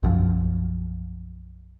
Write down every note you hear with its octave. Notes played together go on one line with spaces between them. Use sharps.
B1 F#2 F3